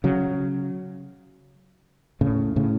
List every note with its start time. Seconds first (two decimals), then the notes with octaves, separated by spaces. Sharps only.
0.04 C#3 F#3
2.21 A2 C#3
2.56 A2 C#3